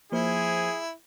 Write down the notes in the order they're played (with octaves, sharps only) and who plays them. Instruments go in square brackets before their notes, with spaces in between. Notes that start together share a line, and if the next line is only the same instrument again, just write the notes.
[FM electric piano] F3 A#3 C5 [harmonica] E4 [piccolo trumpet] G#4